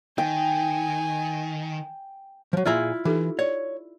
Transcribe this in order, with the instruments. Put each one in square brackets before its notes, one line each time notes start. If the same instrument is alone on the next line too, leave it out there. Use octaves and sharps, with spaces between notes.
[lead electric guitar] D#3 [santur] G5 [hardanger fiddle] G#5
[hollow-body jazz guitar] F3 F#3
[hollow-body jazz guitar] A#2 G#4 A#5 [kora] E4 F4
[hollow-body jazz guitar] E3 [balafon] D#4 G4 A4
[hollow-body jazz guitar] C#5 [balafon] D5